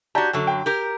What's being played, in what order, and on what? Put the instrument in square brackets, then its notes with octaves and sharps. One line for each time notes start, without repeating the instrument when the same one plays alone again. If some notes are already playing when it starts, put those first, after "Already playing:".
[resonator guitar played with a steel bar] F#4 G4 [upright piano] D5 A5 A#5
[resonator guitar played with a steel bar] F#2 D3 F#3 [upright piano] A4
[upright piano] G5
[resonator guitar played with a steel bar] G4 A#4